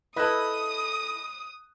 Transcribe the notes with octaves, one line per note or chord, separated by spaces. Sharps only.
E4 A4 B4 D#5 B5 D#6 F#6